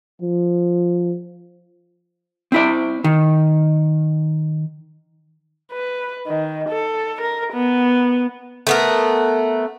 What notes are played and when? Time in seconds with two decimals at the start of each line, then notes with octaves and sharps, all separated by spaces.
0.22 F3
2.52 C4 E4 D5
3.04 D#3
5.72 B4
6.27 D#3
6.69 A4
7.21 A#4
7.53 B3
8.67 A3 B3 A#4